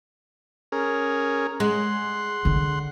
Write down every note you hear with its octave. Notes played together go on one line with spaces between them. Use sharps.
C#4 G#4 A#4
G#3 F#5 C6
D3 D4